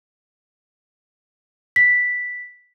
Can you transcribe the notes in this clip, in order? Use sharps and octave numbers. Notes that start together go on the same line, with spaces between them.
B6